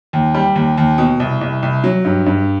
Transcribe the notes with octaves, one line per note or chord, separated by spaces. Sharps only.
D#2
G3
D#2
D#2
B2
C2
C2
C2
F#3
G2
G2